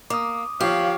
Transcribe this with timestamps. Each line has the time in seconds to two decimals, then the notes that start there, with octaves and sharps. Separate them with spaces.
0.10 A#3 D6 D#6
0.61 F3 G4 C#5 F5